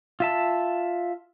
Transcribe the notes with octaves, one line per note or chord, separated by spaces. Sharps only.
F4 E5 A5